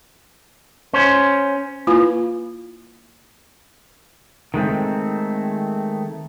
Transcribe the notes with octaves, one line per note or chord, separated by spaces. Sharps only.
C#4 C5
A#3 E4 F4 B4 F5 B5
D#3 G#3 A3 C4